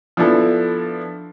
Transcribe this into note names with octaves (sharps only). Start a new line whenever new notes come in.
F3 B3 D4 E4 A4